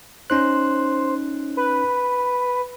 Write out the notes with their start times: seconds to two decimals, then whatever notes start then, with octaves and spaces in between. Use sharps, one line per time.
0.30 C#4 D#4 C5 F#6
1.57 B4